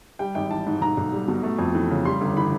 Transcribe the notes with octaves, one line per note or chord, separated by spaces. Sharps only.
G3 G5
G#1 G5
E3 A5
G#2
B1 A#5
B1
G3
B2
A3
F2
E3
C#3
G3 C6
G1
E3 B5